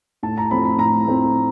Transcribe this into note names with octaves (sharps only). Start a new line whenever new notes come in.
A2 A5
A#5
F3 A3 C4 B5
B5
A2 A#5
F3 A3 C4